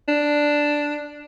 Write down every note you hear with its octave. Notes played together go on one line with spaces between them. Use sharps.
D4